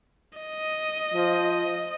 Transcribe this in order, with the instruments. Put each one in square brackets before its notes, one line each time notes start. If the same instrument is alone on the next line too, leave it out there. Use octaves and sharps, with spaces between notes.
[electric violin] D#5
[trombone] F3